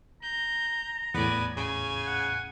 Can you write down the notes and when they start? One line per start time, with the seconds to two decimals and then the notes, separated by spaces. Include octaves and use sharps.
0.23 A#5 G6
1.14 E2 A2 B3 D5 G#5
1.57 C#3 G#5
2.07 F#5